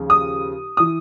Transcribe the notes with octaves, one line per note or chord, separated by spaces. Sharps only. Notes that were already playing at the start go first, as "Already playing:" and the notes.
Already playing: D#2 C#3 F3
D#6
E3 D#6